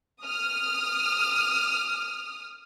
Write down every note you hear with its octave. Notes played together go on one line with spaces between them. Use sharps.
D#6 F6